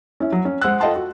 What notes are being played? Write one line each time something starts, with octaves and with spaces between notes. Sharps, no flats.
C#4 E4
F#3
C#4
G#3 C5 F#5 E6 F#6
F4 A4 D#5 G5 A5 C6
F#4